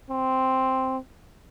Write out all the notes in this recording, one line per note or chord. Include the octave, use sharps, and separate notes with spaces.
C4